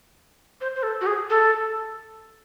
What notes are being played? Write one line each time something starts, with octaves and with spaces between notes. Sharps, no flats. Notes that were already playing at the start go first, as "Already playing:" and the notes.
C5
C5
A4
F#4
G#4
A4